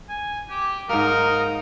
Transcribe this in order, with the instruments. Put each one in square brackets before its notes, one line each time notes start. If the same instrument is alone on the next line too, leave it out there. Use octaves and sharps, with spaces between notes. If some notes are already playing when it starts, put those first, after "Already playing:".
[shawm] G#5
G4
[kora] G#2 A#3 [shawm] D#4 [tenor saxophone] A#4